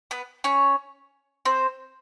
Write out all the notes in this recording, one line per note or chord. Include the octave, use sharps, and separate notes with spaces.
B3 B4
C#4 C#5
C4 C5